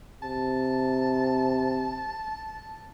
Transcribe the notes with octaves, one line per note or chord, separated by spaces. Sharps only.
C3 A5